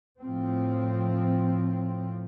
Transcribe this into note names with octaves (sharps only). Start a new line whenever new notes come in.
A2 F3 C4